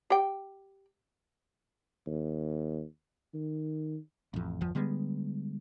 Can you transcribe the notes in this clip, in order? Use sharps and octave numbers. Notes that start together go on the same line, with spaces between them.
G4 G5
D#2
D#3
A1 F2
G1 E2 F3
D3 G3 G#3 B3